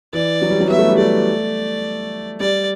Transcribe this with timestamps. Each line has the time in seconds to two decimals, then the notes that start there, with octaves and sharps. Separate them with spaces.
0.13 E3 D5
0.42 F#3
0.50 G3
0.60 F#3
0.69 B3 E5
0.78 A3
0.89 G3
0.98 A3 D5
2.40 G3 D5